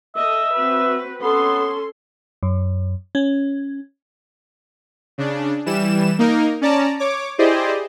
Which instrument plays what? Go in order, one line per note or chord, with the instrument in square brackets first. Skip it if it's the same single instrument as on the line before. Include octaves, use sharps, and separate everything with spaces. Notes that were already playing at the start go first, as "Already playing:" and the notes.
[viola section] A4 D#5 [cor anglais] E5
[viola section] C4 F#4 B4
[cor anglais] B3 [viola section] C#4 A4 C6
[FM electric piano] F#2
C#4
[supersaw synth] C#3 D4
E3 G3 E7
A#3 D#4 A#4
C#4 D5 A5 A#5
C#5 D6
E4 G4 G#4 C5 D5 D#5